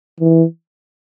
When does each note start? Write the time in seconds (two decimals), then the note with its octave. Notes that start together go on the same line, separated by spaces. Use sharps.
0.20 E3